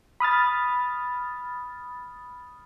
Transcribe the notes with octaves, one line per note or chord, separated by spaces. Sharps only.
B5 D#6 F6 A6